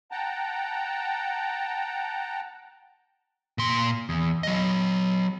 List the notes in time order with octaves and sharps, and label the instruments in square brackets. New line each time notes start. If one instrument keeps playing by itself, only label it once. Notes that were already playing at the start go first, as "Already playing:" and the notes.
[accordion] F#5 G5 A5 A#5
[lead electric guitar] A#2 C6
E2
F#3 D#5